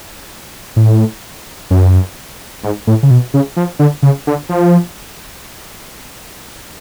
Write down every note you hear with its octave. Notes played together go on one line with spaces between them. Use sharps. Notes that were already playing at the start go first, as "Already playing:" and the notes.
A2
F#2
G#2
A2
C#3
B2
C#3
F3
D3
C#3
D3
F3